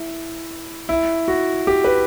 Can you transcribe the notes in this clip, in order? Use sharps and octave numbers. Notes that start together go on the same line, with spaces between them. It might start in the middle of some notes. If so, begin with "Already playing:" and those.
Already playing: E4
E4
F#4
G4
B4